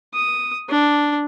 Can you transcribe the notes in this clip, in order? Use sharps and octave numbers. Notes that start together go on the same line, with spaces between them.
D#6
D4